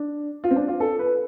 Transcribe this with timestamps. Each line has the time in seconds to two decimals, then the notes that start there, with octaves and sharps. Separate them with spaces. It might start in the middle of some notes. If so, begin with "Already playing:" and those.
Already playing: D4
0.44 F4
0.50 C4
0.56 D4
0.68 F4
0.80 A4
0.99 B4